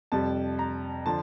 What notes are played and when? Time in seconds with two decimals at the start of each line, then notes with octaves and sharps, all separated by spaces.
0.12 F2 C3 G3 A5
0.59 A#5
1.06 D3 F3 A5